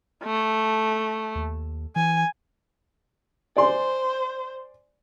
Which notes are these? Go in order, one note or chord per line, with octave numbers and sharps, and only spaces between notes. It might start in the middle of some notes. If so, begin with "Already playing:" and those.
A3
D#2
E3 G#5
C5 D5 G#5 C6